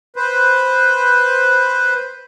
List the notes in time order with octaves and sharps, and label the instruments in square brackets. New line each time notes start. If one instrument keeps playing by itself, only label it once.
[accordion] B4 C5